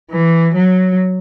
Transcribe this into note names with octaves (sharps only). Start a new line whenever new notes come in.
E3
F#3